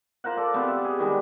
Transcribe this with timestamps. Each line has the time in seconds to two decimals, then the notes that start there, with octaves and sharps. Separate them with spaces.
0.24 F4 A#4 C5 F#5
0.37 A4 D5
0.54 C3 B3 C4
0.68 E5
0.84 G#4
0.99 D#3 G3 G#3